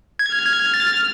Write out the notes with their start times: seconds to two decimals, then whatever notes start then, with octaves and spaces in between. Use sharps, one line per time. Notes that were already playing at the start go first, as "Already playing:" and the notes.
0.19 G#6
0.33 F6
0.46 G#6
0.74 A6